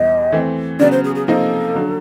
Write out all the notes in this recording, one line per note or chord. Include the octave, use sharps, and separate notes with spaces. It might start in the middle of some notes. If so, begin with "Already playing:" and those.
Already playing: E2 B2 G3 B3 D#5
E3 A3 C4
C#3 F#3 B3 D5
C5
G#4
G#4
C3 F3 A#3 D#4 A4
D3 F#3